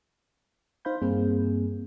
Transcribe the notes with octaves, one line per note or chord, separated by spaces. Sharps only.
D#4 C5 F5 B5 G6
G2 A#3 C4 G#4